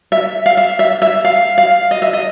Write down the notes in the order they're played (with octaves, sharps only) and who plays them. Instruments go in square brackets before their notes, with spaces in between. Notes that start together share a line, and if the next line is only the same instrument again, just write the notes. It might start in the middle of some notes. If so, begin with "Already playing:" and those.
[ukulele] E5
F5
E5
E5
E5
F5
F5
D#5
E5
D#5